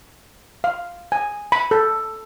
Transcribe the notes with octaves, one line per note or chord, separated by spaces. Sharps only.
F5
G#5
B5
A4